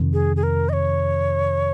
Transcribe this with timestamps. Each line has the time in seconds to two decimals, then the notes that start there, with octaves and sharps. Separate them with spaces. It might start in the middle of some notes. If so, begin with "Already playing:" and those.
Already playing: F2 C3 D#3
0.13 G#4
0.36 G#4
0.43 A#4
0.69 D#5
0.73 C#5